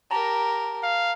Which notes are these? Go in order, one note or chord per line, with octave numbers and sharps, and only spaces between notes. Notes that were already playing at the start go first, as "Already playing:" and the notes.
G4 A#4 A5 A#5
F5